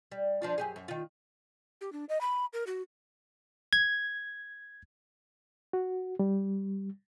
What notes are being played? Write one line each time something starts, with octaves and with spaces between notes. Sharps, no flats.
G3
F3 D4 F4
F#2 G4 G#4
F#2
D#3 F4
G4
D4
D#5
B5
A#4
F#4
G#6
F#4
G3